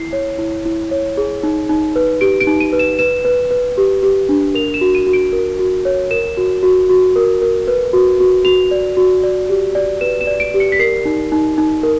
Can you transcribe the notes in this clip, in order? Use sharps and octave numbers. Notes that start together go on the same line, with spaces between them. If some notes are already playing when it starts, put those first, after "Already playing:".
Already playing: E4 C7
C#5
E4
E4
C#5
G#4
D#4
D#4
B4
G4 D7
D7
D#4
D#7
B4
E7
B4 E7
B4
B4
G4
G4
D4
A#4 F7
E7
F#4
D#7
F#4
D7
A#4
F#4
C#5
A#4 E7
F#4
F#4
F#4
A#4
A#4
B4
F#4
F#4
F#4 F7
D5
F#4
D5
G4
D5
B4 E7
E7
D5
D7
G4
C#7
B6
A#4 C7
D#4
D#4
D#4
A#4